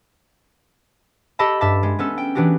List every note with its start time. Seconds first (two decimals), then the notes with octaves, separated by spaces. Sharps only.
1.39 G4 A4 D#5 A5 B5
1.61 G2 E5 A5 D6 B6
1.83 G#3
1.99 B3 C#4 A4
2.18 G5
2.35 E3 B3 D4 F#4 G4